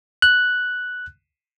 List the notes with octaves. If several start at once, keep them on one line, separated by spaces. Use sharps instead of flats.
F#6